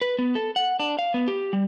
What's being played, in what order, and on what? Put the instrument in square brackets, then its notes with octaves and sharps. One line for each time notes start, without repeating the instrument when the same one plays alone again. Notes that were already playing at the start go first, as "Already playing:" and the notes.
[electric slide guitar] B4
B3
A4
F#5
D4
F5
B3
G4
G3